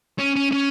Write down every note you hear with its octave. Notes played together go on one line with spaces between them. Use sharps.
C#4
C#4
C#4